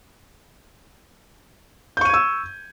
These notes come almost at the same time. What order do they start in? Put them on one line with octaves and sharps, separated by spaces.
G6 C#6 D#7 G#6 E6